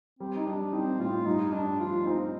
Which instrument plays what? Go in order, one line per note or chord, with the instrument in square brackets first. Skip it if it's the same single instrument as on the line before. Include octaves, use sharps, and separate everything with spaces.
[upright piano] G3 [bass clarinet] C4
[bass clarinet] D#4
[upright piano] G3 [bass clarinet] D4
[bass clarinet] C4 [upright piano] D#4
[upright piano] A2 [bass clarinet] F4
[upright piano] G2 [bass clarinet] D#4
[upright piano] G2 [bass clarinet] D4
[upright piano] F3 [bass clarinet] F4
[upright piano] C4 [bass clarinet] D#4